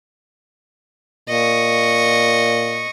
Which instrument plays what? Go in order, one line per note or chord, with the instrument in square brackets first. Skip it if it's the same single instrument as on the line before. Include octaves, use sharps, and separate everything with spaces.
[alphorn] A#2 [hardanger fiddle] D#5 C#6